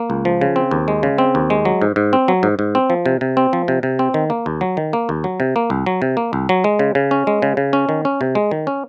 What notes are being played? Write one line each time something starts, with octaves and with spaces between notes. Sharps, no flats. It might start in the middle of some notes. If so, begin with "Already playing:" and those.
Already playing: A#3
C#2
F3
C#3
C4
D#2
G#3
C#3
C4
D#2
G#3
F#3
G#2
G#2
C4
F#3
G#2
G#2
C4
F3
C3
C3
C4
F3
C3
C3
C4
D#3
A#3
D#2
F#3
D#3
A#3
D#2
F#3
C3
A#3
C2
F#3
C3
A#3
C2
F#3
G#3
C#3
C#3
C#4
G#3
C#3
C#3
C#4
D#3
C#4
C3
G#3
D#3
C#4